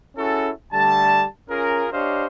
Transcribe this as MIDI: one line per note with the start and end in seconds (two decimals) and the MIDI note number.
0.17 0.51 61
0.17 0.51 64
0.17 0.51 66
0.17 0.51 68
0.17 0.51 69
0.73 1.26 50
0.73 1.26 55
0.73 1.26 57
0.73 1.26 81
1.50 1.87 61
1.50 1.87 65
1.50 1.87 68
1.50 1.87 70
1.93 2.27 62
1.93 2.27 67
1.93 2.27 72
1.93 2.27 73
1.93 2.27 75
1.93 2.27 77